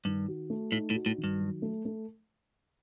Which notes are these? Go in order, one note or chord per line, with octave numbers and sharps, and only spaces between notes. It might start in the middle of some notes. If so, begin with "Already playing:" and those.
G2 D#3
F#4
A3
A2 D#4
A2
F#4
A2
D#3
G2
F#3
A3
A3